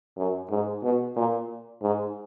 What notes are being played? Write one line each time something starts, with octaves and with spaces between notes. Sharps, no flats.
F#2
G#2
B2
A#2
G#2